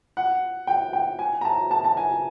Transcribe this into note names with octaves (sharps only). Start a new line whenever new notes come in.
F#5
G5
G5
G#5
A#5
A5
A5
A5
G#5